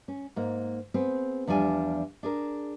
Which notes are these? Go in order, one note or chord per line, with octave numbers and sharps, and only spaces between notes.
C#4
G#2 A#3
B3 C4 G#4
E2 F3 G3 D4 G#5
D4 G#4 A#4